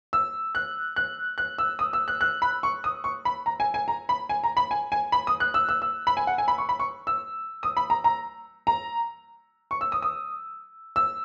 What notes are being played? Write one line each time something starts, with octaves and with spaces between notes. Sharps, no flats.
E6
F#6
F#6
F#6
E6
D#6
E6
F#6
F#6
B5
C#6
D#6
C#6
B5
A#5
G#5
G#5
A#5
B5
G#5
A#5
B5
G#5
G#5
B5
D#6
F#6
E6
E6
E6
B5
G#5
F#5
G#5
B5
C#6
B5
C#6
E6
D#6
B5
A#5
A#5
A#5
C#6
E6
D#6
D#6
E6